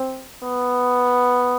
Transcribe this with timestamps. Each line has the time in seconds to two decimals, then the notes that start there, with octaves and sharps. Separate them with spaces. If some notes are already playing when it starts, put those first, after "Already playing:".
Already playing: C4
0.43 B3